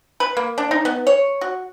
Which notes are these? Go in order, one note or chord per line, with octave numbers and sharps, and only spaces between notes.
B4
A#3
D4
D#4
B3
C#5
F#4